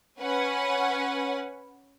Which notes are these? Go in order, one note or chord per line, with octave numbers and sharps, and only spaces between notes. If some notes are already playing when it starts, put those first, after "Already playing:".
C#4 B4 F#5 G#5